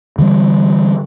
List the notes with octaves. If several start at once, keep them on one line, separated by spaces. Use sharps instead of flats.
D3 E3 G3